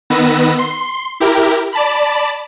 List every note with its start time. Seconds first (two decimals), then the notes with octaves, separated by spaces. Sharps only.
0.10 D#3 B3 B4 E6 A#6
0.59 C6
1.20 E4 G4 A#4
1.73 D5 A5 B5